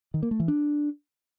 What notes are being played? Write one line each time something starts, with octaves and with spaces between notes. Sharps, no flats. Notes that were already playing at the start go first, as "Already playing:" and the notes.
D#3
A#3
A3
E3
D4